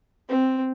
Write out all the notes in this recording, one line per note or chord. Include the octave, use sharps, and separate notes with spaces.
C4